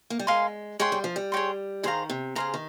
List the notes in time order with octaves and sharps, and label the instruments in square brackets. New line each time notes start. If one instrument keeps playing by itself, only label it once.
[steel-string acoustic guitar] A#3
G3
[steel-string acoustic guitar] G#3 [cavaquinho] A#4 F5 G#5 C6
[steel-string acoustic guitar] G#3 [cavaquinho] G#4 C#5 G5 C6
[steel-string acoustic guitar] G3
F3
G3
[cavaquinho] G#4 C#5 G5 C6
[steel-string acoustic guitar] D#3 [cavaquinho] G#4 C5 F5 A#5
[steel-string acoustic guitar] C3
[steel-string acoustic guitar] C#3 [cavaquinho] G#4 C5 F5 A#5
[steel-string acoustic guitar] D#3